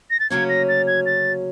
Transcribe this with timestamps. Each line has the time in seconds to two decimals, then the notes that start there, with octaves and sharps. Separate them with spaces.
0.10 A#6
0.20 A6
0.30 D2 C#3 F#3 A#3 C#4 G#6
0.49 A#6
0.69 A6
0.87 G#6
1.06 A6